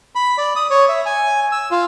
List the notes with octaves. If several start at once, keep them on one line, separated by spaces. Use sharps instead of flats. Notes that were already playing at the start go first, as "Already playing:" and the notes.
B5
D5
D#6
C#5
E5
G#5
E6
F4